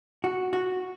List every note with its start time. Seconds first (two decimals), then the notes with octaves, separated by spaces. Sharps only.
0.24 F#4
0.53 F#4